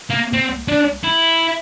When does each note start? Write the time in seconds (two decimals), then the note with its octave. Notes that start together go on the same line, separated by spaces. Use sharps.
0.10 A#3
0.33 C4
0.69 D4
1.03 E4